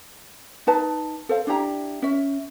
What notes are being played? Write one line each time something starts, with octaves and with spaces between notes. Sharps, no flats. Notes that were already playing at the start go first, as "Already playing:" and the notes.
D#4 B4 A5
A4 C5 F5
D4 E4 G4 A#5
C#4 E5